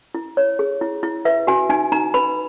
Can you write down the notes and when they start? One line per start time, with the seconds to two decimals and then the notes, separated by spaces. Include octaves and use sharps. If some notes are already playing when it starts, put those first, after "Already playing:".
0.15 E4
0.37 C#5
0.59 G#4
0.81 E4
1.03 E4
1.25 B4 E5
1.47 F#4 G#5
1.69 D#4 G#5
1.92 D#4 A#5
2.14 B4 B5